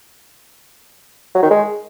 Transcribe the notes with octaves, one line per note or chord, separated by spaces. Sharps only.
F#3
D#3
G#3